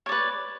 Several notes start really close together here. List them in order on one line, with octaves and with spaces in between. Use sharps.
C#5 D5 B4